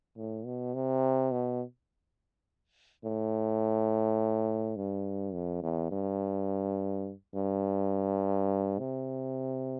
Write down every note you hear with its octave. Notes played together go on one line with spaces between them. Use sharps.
A2
B2
C3
B2
A2
G2
F2
E2
G2
G2
C3